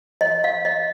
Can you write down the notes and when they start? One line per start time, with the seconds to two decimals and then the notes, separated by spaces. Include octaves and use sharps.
0.21 D#5
0.44 F5
0.65 D#5